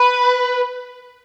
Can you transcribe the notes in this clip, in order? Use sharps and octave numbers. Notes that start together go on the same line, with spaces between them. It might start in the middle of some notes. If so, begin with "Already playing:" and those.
Already playing: B4